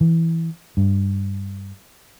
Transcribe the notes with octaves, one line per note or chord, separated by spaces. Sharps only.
E3
G2